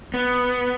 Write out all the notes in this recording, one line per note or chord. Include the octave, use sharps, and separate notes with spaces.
B3